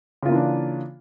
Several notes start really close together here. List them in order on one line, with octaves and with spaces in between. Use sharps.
C#3 F4 A#3 E3 D4